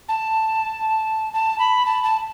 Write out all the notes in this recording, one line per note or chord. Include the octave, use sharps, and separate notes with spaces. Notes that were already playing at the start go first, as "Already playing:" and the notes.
A5
A5
B5
A5
A5